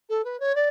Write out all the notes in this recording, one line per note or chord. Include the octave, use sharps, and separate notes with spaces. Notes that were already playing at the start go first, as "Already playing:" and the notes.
A4
B4
C#5
D5